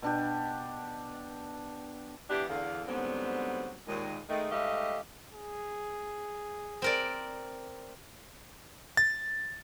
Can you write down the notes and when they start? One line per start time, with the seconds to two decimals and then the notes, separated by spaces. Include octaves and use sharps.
0.02 B2 D4 G4
2.30 E3 B3 D4 G4
2.49 E2 D3 F5
2.88 G#2 D3 F#3 G3 B3 C4
3.87 D#2 A#2 G#3
4.29 D#3 G#3 A3
4.51 G#2 G3 A3 G4 D#5 F5
5.33 G#4
6.82 C4 A#4 D5
8.97 A6